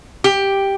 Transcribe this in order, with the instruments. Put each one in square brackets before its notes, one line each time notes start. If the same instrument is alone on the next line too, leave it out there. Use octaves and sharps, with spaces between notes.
[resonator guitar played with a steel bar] G4